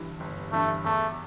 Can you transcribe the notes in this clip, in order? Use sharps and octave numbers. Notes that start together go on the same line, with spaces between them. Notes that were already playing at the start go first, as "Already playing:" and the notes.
Already playing: G1 G2 E3
G1
G2 E3 A3
E2 A3